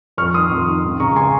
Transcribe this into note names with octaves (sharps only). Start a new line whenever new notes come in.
F2 C#6 F6
D#3 C6 D#6
F2
D#3
C#2
C#3 A#5 C#6
G#5 C6